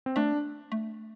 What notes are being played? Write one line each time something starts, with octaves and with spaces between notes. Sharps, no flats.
C4
A3 D4
A3